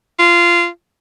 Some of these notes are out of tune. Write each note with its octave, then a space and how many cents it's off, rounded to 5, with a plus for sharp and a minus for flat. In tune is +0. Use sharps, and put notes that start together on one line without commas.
F4 -15